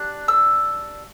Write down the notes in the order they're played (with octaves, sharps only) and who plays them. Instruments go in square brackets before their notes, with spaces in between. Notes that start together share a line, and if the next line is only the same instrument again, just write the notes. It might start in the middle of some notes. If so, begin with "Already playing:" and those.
Already playing: [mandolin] D4 G4 F#6
E6